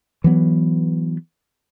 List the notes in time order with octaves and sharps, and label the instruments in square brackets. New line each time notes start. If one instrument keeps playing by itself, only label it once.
[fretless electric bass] E3 F#3 B3